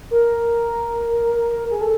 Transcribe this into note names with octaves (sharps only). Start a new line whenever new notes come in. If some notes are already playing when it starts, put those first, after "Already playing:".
A#4
G#4
A4